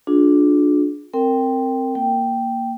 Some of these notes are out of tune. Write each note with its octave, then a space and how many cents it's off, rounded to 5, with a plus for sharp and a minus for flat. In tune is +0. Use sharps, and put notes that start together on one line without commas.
D4 +0 F4 +35 G#4 +20
C4 +0 A#4 -20 G5 +0
A#3 +0 G5 -5